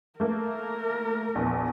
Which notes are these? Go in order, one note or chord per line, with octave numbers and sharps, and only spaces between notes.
A3 A#3 A#4
A#1 E2